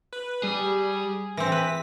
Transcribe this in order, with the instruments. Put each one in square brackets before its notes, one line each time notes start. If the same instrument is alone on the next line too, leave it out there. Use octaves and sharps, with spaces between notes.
[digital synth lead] B4
[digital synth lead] G3 [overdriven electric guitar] G#4
[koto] E3 C4 [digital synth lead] A#6
[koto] B4 [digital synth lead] B6